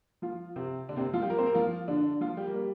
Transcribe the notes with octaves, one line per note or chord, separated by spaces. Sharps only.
F3 F4
C3 C4
D3 D4
C3 C4
F3 F4
G3 G4
A#3 A#4
C4 C5
A#3 A#4
F3 F4
D3 D4
F3 F4
G3 G4
A#3
G3